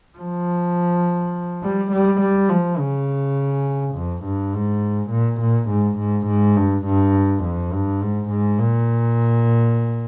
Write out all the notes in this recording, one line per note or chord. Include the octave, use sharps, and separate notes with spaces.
F3
G3
G3
G3
F3
C#3
F2
G2
G#2
A#2
A#2
G#2
G#2
G#2
G2
G2
F2
G2
G#2
G#2
A#2